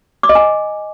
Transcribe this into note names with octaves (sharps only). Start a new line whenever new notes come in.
D6
D#5
G#5